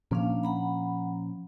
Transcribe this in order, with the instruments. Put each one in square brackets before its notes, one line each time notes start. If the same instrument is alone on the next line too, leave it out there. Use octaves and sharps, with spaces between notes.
[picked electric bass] A#2 F3 C#4 [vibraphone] A#3 D4 F5
[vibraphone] F#5 A#5 B5